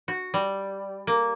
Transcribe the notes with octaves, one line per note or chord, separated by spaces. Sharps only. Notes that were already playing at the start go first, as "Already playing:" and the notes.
F#4
G3
A#3